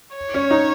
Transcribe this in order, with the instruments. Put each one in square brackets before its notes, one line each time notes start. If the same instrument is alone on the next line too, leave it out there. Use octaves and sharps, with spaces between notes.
[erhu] C#5
[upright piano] C#4
D#4